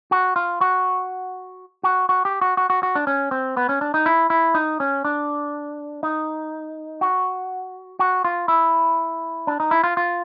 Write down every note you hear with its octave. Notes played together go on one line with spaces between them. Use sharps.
F#4
F4
F#4
F#4
F#4
G4
F#4
F#4
F#4
F#4
D4
C#4
C4
B3
C#4
D4
D#4
E4
E4
D#4
C#4
D4
D#4
F#4
F#4
F4
E4
D4
D#4
E4
F4
F4